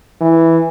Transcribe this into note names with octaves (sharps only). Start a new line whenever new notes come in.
E3